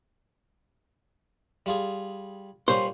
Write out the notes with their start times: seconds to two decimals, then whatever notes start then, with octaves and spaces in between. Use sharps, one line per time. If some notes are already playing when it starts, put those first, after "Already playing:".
1.66 G3 F4 G#4
2.68 A#2 G3 C#4 C5